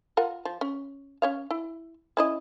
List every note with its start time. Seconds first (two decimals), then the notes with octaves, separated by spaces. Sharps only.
0.17 F4 A#4 F#5
0.45 F3
0.61 C#4
1.22 C#4 C#5 F5
1.51 E4
2.17 C#4 E4 D#5